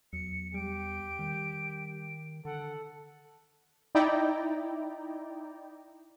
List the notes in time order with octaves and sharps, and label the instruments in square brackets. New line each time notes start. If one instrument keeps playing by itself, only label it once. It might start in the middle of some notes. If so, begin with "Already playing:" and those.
[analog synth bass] E2 [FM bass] F#3 [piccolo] C#7
[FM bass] G3 [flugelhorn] G4 [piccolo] D7
[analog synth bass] D#3 [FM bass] G3
[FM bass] D3 [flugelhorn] A4 [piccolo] F#5
[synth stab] D#4 E4 D5 G5 A#5